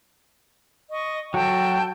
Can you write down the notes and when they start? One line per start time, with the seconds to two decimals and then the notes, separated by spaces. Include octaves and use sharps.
0.91 D#5 C#6
1.34 F#3 F#4 A4 G5 A5